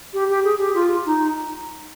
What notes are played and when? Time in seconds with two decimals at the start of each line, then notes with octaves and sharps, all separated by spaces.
0.13 G4
0.29 G4
0.44 G#4
0.59 G4
0.74 F4
1.05 D#4